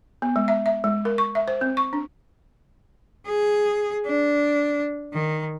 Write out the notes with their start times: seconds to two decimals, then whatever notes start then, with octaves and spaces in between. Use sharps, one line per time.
0.22 B3
0.36 G#3
0.48 E5
0.66 E5
0.84 G#3
1.05 A#4
1.18 C#6
1.35 E5
1.48 C5
1.61 C4
1.77 C#6
1.93 D4
3.27 G#4
4.06 D4
5.14 D#3